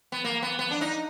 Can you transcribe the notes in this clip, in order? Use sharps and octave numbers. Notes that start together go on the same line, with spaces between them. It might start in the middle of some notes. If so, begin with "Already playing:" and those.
B3
A#3
B3
B3
D4
D#4